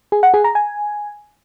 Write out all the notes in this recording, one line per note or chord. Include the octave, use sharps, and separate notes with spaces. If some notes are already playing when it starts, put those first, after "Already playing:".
G#4
F#5
G#4
A#5
G#5